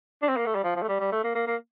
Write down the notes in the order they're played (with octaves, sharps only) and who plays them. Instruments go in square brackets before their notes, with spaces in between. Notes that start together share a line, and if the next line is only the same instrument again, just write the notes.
[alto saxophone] D4
C4
A#3
A3
G3
F3
F3
A3
G3
G3
A3
A#3
A#3
A#3